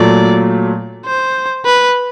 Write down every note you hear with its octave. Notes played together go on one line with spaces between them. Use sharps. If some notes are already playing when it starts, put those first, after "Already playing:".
Already playing: A#2 F#3 A3 D5
C5
B4